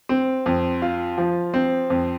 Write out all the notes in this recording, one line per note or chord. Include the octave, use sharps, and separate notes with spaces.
C4
F2
F4
F3
C4
F2